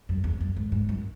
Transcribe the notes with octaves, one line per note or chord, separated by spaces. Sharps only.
F#2
E2
F#2
G#2
G#2
F#2